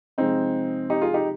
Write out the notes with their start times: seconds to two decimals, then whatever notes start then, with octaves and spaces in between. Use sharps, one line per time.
0.18 C3 F3 G#3 C4 D#4
0.90 D#4 G4
1.02 F4 G#4
1.14 D#4 G4